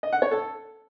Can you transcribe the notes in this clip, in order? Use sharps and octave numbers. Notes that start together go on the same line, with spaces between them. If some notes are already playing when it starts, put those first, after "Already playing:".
D#5
F#5
C#5
A4